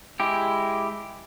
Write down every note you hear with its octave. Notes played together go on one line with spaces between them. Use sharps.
G#3 E4 G4